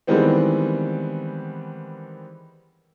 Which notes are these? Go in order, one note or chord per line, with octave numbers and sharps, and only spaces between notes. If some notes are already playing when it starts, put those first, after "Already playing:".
D#3 E3 G3 G#3 B3 C4